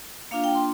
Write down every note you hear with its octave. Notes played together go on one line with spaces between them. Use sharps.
A#3 D4 F4 F5
G5
C6